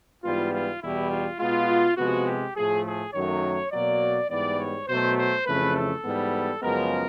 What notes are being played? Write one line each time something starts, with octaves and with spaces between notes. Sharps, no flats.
G#2 E3 G3 B3 F4
F4
E2 B2 G3 E4
F4
B2 G#3 B3 F4
C3 F3 G#3 B3 F#4
G4
A2 F3 A3 G#4
G#4
F#2 D#3 F#3 A3 C#5
B2 F#3 A#3 D5
G#2 E3 G3 B3 D5
C#5
B2 F#3 A3 C5
C5
F2 C#3 E3 A3 B4
A4
G#2 E3 G3 B3
F#2 C#3 F3 G#3 B3 A#4